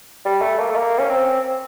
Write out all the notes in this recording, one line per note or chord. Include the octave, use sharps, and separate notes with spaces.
G3
A3
A#3
A3
A#3
C#4
C4